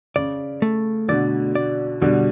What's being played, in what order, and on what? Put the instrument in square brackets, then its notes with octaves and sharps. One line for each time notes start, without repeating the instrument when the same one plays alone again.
[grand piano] C#3 [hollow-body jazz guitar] D5
[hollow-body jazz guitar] A3
[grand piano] B2 D3 [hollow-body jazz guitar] D5
[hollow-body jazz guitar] D5
[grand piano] B2 D3 [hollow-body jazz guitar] G3